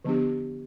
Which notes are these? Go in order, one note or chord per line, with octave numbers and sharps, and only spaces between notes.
D3 F3 B3 D4 G4